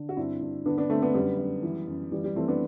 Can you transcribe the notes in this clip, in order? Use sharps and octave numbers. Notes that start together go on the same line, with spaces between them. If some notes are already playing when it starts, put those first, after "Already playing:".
Already playing: D3
F#4
G2 C4 E4
G2
D3 B3 D4
B3 D4
D3 A3 C4
B3 D4
F#2 G3 B3
F#2
E3
F#2
E3 G3
G3
E3 A3 C4
B3 D4